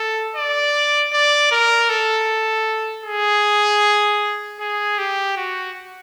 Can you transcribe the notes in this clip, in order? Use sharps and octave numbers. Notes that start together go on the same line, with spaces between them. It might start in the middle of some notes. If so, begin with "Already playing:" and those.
Already playing: A4
D5
D5
A#4
A4
G#4
G#4
G4
F#4